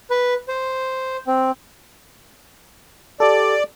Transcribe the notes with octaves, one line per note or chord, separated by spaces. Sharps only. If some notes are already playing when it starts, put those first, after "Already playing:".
B4
C5
C4
G4 A4 D5